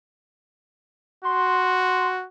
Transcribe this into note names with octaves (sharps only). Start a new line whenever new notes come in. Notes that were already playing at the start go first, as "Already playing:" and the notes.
F#4 C6